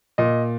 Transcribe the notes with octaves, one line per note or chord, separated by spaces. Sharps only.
A#2 D#5